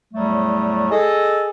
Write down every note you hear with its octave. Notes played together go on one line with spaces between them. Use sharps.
E2 A2 F#3 G3 A3
G#4 A4 D#5